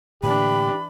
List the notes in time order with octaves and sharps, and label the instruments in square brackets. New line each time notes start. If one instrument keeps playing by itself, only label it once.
[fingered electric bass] A2 D3 A#3 [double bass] E3 D4 [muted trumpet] G4 [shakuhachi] B5